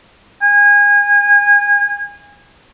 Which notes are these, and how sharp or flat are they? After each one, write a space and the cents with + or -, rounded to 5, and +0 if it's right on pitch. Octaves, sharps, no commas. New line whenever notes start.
G#5 -25